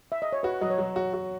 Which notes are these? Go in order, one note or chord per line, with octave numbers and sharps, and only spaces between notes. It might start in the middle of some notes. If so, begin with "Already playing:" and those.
E5
D#5
C#5
F#4 B4
F#3 D#5
C#5
F#3
F#4
F#4